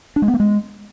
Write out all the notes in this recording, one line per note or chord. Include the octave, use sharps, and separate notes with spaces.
D4
G#3
B3
A3
G#3